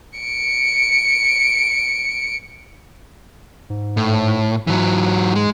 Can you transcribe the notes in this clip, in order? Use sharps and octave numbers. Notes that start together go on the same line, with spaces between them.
C#7 D7
G#2
A2
G#2 E3 F#3
G#3